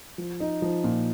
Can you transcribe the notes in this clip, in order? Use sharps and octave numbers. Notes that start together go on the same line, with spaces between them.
F3
D#4
F3
A#2